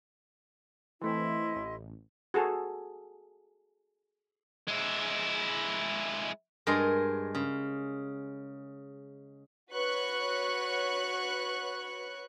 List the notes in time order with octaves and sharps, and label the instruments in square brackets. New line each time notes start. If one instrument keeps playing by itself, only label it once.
[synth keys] E3 A3 C4 [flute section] E4 D#5 C6
[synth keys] A1
[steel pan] F#4 G#4 A4
[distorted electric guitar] G#3 E4
[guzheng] G2 G#3 A#4 D#5 A#5 C6
C#3
[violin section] F#4 B4 C#5 C#6 F#6